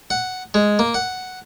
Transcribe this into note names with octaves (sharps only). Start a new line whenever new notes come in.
F#5
G#3
A#3
F#5